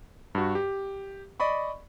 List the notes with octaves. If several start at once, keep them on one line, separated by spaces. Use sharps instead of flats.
G2 F#4
G4
D5 D#5 B5 C#6